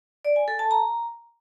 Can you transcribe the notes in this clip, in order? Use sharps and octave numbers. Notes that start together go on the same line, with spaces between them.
D5
G#5
A4
A5
A#5